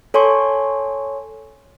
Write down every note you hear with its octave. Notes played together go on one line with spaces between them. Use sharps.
A4 C#5 G#5 C6 C#6